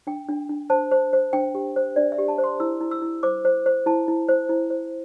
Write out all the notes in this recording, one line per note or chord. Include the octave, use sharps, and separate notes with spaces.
D4 G5
D4
D4
C5 A5
C5
C5
D4 G5
G4
C5
D4 D5
E5
G4
A5
C5
C6
E4 E6
E4
E6
E4
C5 D6
C5
C5
E4 A5
E4
C5
E4
C5